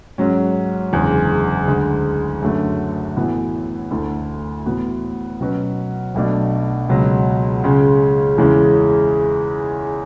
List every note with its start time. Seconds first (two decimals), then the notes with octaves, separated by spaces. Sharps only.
0.18 G#2 F#3 C#4
0.92 F#1 E2 D3 G#3
1.67 D2 D3 G#3
2.41 F#2 D3 F#3 A3
3.16 A2 E3 B3 F#4
3.91 D2 D3 A3 E4 A4
4.66 A2 E3 B3 F#4
5.40 B2 F#3 C#4 F#4 B4
6.14 B1 B2 A3 D4 F#4
6.89 C#2 B2 F#3
7.63 C#2 C#3 G#3 C#4
8.38 E2 C#3 E3 G#3 C#4